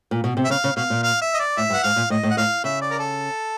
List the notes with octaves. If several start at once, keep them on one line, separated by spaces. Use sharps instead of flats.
A#2
B2
C3
E5
C#3 F5
C#3
B2 F5
A#2
F5
E5
D#5
D5
A2 E5
G2
F#5
G#2 F5
A#2
A2 D#5
A2
F#5
A2 F5
C#3 E5
D5
A#4
A4